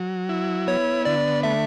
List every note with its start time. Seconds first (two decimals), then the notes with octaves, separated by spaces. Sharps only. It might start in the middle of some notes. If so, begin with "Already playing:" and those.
Already playing: F#3
0.29 E4
0.67 B3 C#5
1.05 D3 D5
1.43 A3 E5